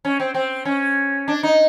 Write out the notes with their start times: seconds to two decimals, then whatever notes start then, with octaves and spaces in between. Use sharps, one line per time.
0.05 C#4
0.20 C4
0.34 C4
0.65 C#4
1.28 D4
1.43 D#4